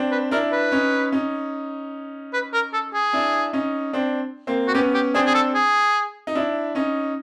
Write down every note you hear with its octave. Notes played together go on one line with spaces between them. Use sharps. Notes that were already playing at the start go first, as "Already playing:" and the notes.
Already playing: C4 D4
B4
D4 E4 A#4
B4
C#4 D#4
C#4 D#4
B4
A#4
A4
G#4
D4 E4
C#4 D#4
C4 D4
A#3 C4
F#4
B3 C#4 G4
G4
C4 D4 G#4
G#4
A4
G#4
D#4
D4 E4
C#4 D#4